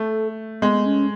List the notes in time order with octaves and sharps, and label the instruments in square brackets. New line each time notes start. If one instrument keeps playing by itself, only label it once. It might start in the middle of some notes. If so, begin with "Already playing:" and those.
Already playing: [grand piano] A3 [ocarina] A4
[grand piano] G#3 [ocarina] B3
[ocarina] C#4